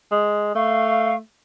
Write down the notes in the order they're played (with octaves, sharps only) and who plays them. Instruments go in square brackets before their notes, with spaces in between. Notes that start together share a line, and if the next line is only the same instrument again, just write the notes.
[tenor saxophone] G#3
[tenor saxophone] A3 [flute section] F5 C#6